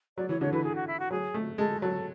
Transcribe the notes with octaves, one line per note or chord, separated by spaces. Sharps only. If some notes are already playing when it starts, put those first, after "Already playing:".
F#3 D5
E3 C#5
D3 C#5
E3 B4
G#4
F#4
E4
F#4
F#3 G#4
A3
G#3 A4
F#3 A4